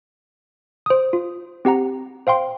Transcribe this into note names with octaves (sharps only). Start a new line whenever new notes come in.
C5 D#6
F4
C4 G4 F#5 A#5
C5 F5 G5 C6